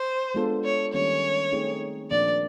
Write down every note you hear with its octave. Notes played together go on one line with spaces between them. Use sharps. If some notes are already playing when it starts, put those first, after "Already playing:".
Already playing: C5
G#3 B3 D4 F4 A4
C#5
D#3 G3 A#3 C#4 C#5
A3 C4 D#4 G#4
A#2 F3 A#3 D4 D5